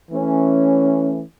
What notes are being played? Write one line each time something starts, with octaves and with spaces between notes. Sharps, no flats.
E3 A3 C#4